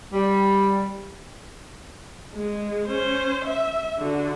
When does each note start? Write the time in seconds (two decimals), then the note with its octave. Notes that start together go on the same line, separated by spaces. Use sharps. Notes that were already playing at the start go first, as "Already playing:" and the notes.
0.13 G3
2.34 G#3
2.87 C#4 C5
3.45 E5
3.99 D3 F#4